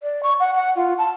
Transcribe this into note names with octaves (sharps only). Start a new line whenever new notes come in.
D5
C#6
F#5
F#5
F4
A5